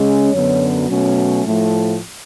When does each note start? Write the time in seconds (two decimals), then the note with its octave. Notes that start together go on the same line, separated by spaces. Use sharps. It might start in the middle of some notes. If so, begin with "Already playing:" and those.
Already playing: C#3 G#3 C#4
0.33 F#2 D3 F#3 B3 C#5
0.89 B2 F#3 A3 C#4
1.44 A2 F3 A3